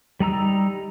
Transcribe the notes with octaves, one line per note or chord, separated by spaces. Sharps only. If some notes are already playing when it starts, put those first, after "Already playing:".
G3 D#4 A#5 E6